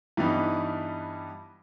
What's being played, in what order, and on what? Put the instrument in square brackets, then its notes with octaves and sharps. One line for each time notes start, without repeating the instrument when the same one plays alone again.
[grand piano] G2 E3 G3 B3 D#4